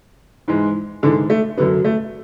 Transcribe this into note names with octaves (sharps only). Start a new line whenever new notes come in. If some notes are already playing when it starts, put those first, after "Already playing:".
G#2 E3 G#3
G#2 D3 E3 G#3 D4
A3
F#2 D3 F#3 B3
A3